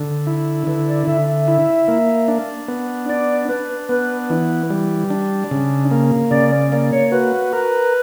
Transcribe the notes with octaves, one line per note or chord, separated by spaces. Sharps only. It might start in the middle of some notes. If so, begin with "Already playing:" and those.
Already playing: D3
E4
D3 B4
D5
D3 E5
E5
E4
A#3
D4
B3
D4 D5
D4 B4
B3 B4
E3
G3
D4
C#3
A#3
C#3 D5
D5
A#3 D5
C#5
F#4 B4
A#4